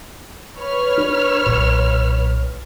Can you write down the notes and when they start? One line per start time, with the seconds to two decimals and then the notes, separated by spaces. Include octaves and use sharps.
0.59 B4 C#5 F6
0.97 D4
1.46 B1 A#2